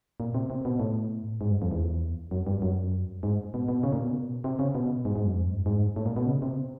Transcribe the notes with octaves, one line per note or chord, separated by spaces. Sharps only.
A#2
C3
C3
B2
A2
G#2
G2
F2
E2
F#2
G2
F#2
G#2
B2
B2
C#3
A#2
B2
C3
C#3
B2
G#2
G#2
F#2
F2
F#2
G2
G#2
A2
A#2
B2
C#3
C3